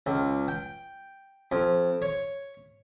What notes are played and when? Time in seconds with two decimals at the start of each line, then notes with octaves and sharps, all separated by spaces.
0.06 C#2
0.48 G5
1.52 F2
2.02 C#5